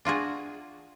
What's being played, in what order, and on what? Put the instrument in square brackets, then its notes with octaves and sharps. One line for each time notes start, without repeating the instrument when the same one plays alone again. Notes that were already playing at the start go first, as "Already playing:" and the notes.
[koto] D4 F4 F#4 G#4